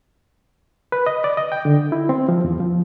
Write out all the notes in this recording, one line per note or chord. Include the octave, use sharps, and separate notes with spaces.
B4
D#5
D5
D#5
G5
D3
E4
C4
F3
E2
F3